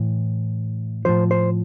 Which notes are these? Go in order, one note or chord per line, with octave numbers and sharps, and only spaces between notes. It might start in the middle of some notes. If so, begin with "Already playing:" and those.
Already playing: A2 E3
A2 F3 C5
C5